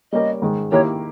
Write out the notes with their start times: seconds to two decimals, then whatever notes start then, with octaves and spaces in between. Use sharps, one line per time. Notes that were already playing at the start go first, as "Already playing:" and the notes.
0.12 G3 A#3 C#4 G4 A#4 D#5
0.42 G#2 D#3 G#3
0.72 D#3 A#3 E4 G4 A#4 C#5